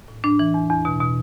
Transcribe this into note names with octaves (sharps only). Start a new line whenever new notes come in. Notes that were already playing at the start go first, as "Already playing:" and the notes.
A2
A2 D4
E3
E2
E2
B2
B2